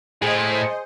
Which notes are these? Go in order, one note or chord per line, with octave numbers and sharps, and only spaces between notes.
A2 G#4 C5 D#5